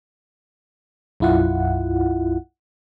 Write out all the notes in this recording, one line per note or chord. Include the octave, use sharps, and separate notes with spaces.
B1 F#2 E4 F4 F#5